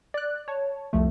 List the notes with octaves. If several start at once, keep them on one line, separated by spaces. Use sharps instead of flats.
D5 F#6
C#5 A5
C2 F2 F3 A3